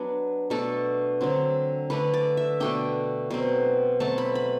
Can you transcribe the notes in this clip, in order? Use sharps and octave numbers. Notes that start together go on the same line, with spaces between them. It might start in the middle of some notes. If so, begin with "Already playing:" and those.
Already playing: F#3 B3 D4
B2 A3 D4 A4
D3 F#3 C4
D3 A3 D4 B4
D5
E5
B2 A3 D4 G5
B2 F#3 C4
B2 F#3 A3 C4 A5
B5
B5